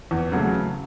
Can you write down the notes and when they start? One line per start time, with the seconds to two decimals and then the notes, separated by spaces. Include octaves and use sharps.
0.11 E2
0.32 C#3 F#3 A3